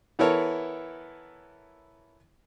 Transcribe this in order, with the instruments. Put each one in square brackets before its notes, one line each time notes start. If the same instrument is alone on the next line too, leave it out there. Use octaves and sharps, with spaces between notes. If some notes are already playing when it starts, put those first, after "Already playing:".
[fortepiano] E3 B3 E4 A4 A#4 C#5